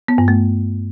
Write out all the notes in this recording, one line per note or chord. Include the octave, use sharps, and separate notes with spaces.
B3
G2
A3